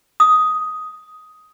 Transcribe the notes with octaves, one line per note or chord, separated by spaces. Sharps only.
D#6